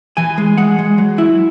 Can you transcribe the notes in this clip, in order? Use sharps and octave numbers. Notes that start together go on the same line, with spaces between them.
E3 G#5
G#3
G#3 F#5
G#3
F#3
E4